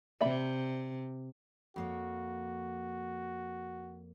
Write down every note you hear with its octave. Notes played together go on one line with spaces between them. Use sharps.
C3 D5 E5 B5
F2 A#3 F#4 C#5